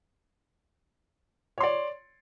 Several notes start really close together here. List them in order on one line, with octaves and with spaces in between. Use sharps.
C#5 C6 D5